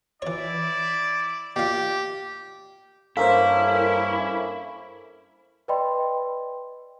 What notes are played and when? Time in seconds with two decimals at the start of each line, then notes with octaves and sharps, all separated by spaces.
0.22 E3 E4 C#5 D5
1.56 A#2 G4 F5
3.17 G2 A#3 C#4 E4 A4 A#4 C5 F5
5.68 B4 D5 D#5 G5 B5 C6